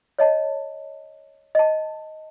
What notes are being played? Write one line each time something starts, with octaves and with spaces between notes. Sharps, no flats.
C#5 D#5 A5
D#5 A5